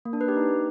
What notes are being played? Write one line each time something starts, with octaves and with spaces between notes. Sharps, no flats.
A#3
D4
B4
G4
D#4